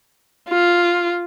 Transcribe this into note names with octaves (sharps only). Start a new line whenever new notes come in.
F4